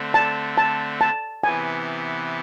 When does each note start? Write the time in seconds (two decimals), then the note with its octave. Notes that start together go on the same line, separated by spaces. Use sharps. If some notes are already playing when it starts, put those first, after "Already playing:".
Already playing: D3 A3 C4
0.14 A5
0.58 A5
1.01 A5
1.44 C3 E3 B3 G#5